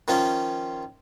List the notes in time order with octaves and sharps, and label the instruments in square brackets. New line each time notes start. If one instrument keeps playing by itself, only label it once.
[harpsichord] D#3 F3 C#4 F4